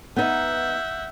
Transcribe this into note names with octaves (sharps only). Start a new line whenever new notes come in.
B3 D#4 E5 F#5 G6